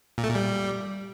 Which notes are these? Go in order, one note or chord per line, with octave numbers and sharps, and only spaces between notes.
A#2
A3
A#2
G3